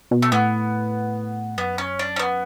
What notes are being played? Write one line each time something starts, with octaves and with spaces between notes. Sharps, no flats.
B2
A3
A2 B3
F#2 B3
C#4
D4
C#4
B3